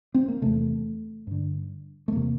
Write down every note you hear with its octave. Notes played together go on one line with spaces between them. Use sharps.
C4
A#3
E2 C3 A3
G2 D3
A3
E2 C3 A#3